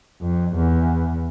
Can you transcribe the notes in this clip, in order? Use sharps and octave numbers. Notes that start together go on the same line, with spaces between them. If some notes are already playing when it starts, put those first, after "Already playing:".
F2
E2